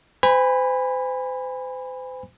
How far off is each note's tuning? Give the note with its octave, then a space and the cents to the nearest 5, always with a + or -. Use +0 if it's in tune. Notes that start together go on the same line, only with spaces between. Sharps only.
C5 -40 G#5 -30 B5 +0